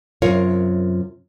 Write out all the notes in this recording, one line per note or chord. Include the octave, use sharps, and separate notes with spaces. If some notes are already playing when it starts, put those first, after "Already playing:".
F#2 C3 F4 A#4 C#5